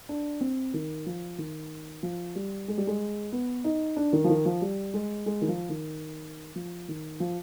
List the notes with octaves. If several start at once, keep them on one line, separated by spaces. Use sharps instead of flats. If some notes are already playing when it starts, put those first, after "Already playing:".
D4
C4
D#3
F3
D#3
F3
G3
G#3
G3
G#3
B3
D#4
D4
D#3
F3
D#3
F3
G3
G#3
G#3
D#3
F3
D#3
F3
D#3
F3